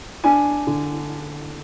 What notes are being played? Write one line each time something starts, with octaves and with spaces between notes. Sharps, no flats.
D4 G#5
D3